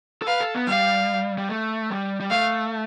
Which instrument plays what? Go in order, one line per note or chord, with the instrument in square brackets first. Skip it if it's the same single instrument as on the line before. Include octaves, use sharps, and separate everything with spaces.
[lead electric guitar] A4
[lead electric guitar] B4 [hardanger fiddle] F5
[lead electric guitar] A4
B3
[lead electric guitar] G3 [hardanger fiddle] F5
[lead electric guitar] G3
A3
G3
G3
[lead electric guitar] A3 [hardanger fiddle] F5